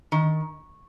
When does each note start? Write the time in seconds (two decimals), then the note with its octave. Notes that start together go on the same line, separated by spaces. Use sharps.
0.12 D#3